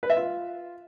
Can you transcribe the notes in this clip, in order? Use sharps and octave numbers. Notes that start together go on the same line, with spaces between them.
B4
E5
F4